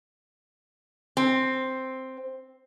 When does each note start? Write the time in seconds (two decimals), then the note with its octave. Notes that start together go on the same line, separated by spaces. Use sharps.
1.17 C4